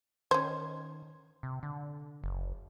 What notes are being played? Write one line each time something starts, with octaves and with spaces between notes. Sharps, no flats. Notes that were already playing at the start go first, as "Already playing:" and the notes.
D#3 C#4 C5
C3
D3
F#1